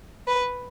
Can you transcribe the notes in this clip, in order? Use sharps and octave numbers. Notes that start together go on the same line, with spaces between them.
B4